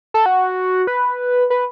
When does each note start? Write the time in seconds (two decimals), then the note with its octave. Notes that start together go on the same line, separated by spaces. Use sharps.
0.14 A4
0.26 F#4
0.87 B4
1.50 B4